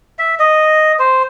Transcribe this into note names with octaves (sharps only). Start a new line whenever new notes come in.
E5
D#5
C5